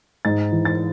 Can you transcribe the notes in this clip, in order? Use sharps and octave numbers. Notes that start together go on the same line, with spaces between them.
G#2 A6
E3
A6